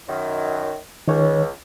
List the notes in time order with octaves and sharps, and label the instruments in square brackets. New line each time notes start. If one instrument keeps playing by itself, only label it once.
[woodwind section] F#2 D#3
[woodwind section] C#2 [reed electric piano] D#3 C#5